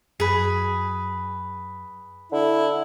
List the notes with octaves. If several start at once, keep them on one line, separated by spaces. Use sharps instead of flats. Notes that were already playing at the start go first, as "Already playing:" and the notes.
F#2 G#4 B4
D3 E4